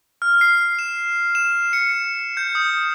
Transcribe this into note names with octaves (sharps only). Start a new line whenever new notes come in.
F6
C7
E7
E7
C#7
G6
D#6